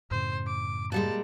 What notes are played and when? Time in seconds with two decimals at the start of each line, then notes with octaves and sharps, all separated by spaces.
0.11 F#2 A2 C#3 C5
0.47 D6
0.92 A#2 G3 G#3 A5